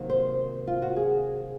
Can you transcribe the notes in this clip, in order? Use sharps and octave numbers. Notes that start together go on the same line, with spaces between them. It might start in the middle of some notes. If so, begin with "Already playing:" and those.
Already playing: C3 D#3 F#3 A#3
C5
F4
F#4
G#4